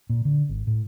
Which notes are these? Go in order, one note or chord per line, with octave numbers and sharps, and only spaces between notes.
A#2
D3
G#1
A2